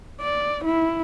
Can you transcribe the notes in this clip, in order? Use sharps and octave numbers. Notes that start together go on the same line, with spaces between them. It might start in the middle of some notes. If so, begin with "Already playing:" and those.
D5
E4